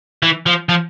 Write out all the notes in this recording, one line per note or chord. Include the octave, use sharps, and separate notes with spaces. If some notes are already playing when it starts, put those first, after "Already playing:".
E3
F3
F3